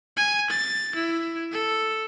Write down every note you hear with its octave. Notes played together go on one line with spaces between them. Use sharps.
G#5
A6
E4
A4